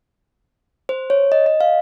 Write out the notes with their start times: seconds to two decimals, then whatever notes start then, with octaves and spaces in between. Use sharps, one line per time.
0.89 C5
1.10 C#5
1.32 D#5
1.46 D#5
1.61 F5